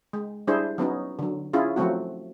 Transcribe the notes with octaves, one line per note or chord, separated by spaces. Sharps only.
G#3
G3 D4 E4 G#4 C5
F#3 B3 C#4 D#4
D3 F#3
C#4 E4 F4 G#4
F3 F#3 A3 C4 F#4